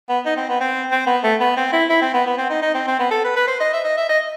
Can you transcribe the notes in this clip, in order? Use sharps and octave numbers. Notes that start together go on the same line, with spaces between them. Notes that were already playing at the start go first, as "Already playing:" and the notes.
B3
D#4
C4
B3
C4
C4
B3
A3
B3
C4
E4
E4
C4
B3
B3
C4
D#4
D#4
C4
C4
B3
A4
B4
B4
C5
D#5
E5
D#5
E5
D#5